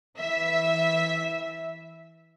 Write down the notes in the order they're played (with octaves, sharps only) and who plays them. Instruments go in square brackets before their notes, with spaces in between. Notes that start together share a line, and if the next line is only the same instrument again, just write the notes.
[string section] E3 E5